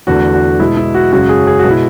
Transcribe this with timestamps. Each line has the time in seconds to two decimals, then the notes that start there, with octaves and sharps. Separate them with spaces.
0.07 E2 D3 A3 F#4
0.34 F#4
0.59 B2 G#3 E4
0.77 E4
0.95 F#4
1.12 F#2 C#3 G#3 F#4
1.29 G#4
1.47 G#4
1.59 F#4
1.65 B2 G#3
1.71 E4